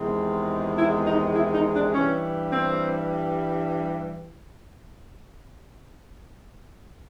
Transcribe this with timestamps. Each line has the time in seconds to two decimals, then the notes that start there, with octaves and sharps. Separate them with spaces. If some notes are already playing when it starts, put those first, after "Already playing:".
Already playing: E2 C3 D#3 G#3
0.77 E4
1.05 D#4
1.35 E4
1.54 D#4
1.75 D4
1.93 G2 E3 G3 C#4
2.52 C4